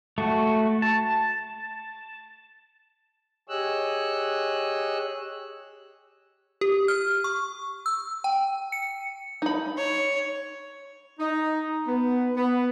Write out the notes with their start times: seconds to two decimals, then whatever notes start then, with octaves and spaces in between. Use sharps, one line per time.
0.18 A3 F#4
0.82 A5
3.49 G4 G#4 C#5 D#5 E6 F#6
6.61 G4
6.88 F6
7.24 C#6
7.86 E6
8.24 G5
8.72 C#7
9.42 D#4 B5
9.77 C#5
11.19 D#4
11.87 B3
12.36 B3